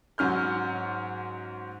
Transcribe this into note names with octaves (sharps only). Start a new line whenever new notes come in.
G#2 F#3 C#4 F6 G6